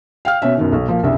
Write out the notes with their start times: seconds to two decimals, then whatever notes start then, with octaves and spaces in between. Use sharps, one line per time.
0.25 F5 G5 F6
0.42 B2 C#4 E5
0.57 F#2 B2 D#3
0.72 B1
0.89 A#2 F3 A#3
1.03 F#1 C2 D3 E5